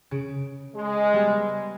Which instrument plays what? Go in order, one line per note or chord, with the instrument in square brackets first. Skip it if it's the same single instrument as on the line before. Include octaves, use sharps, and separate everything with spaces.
[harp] C#3 D7
[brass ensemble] G#3
[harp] G3 B3